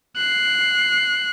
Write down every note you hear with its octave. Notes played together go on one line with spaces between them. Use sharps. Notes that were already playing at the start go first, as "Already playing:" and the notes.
F#6 C7